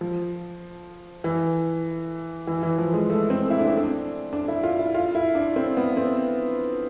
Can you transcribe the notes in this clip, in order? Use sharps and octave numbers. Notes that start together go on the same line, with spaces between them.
F3
E3
E3
E3
F3
G#3
A3
C4
E4
D4
C4
D4
D4
E4
F4
E4
F4
E4
D4
C4
B3
C4